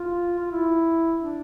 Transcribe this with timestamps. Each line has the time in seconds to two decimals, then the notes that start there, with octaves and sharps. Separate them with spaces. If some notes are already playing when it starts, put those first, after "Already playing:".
Already playing: F4
0.39 F4
0.51 E4
1.19 D4